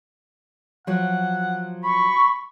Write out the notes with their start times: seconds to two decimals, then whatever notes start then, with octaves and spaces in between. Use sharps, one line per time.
0.87 F3 F#3 F#5
1.83 B5 C#6